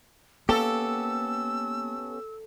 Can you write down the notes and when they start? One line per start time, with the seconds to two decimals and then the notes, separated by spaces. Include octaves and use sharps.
0.49 A#3 B3 C#4 G4 A4 E6